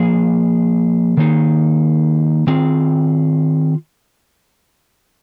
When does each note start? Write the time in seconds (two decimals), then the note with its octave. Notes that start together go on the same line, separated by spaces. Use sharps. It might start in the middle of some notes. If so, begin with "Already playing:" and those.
Already playing: F3 A#3 G#4
1.17 D#3 A#3 D#4 G#4
2.47 D#3 C4 F4 G#4